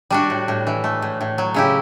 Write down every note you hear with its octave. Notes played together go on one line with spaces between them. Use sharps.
G3 D4 F#4
A2
A2
E3
A3
A2
A2
F#3
C#3 E4 G4